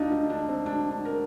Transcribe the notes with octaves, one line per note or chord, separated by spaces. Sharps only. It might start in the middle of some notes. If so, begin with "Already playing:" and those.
Already playing: D2 D3 D4 D#4 F4
D#4
D4
C4
D4
D4
A#4